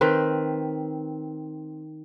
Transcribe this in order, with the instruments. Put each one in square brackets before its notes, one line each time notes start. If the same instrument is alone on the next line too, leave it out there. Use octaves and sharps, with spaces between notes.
[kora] D#3 C4 B4